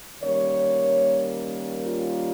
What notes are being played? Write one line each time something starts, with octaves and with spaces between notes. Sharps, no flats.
D#3 G3 A#3 C#4 C#5
F4